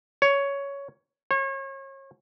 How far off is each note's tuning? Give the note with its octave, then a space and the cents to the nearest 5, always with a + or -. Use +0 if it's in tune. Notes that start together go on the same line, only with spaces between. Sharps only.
C#5 +10
C#5 -35